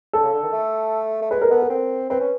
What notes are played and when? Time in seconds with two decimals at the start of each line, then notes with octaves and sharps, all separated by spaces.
0.13 D3 A4
0.23 C#3
0.33 D3
0.43 D#3
0.53 A3
1.22 A3
1.31 G#3 B4
1.41 A#4
1.51 B3 A4
1.62 A#4
1.70 C4
2.10 C4 B4
2.21 C#4